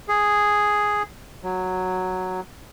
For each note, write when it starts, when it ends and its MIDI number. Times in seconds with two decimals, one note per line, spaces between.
0.08 1.03 68
1.43 2.41 54